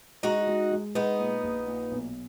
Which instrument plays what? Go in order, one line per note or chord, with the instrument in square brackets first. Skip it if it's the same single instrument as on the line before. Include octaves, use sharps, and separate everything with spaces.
[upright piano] G#3 [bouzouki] D#4 F#4
[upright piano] G#3
G#3
[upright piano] G#3 [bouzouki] B3 D#4
[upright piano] A#2
A#1
A#2
B1